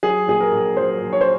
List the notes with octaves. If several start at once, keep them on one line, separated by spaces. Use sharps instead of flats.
F#3 G#4
A#1 G#4
A#4
A#1
F#3 C5
A#1
C#5
C5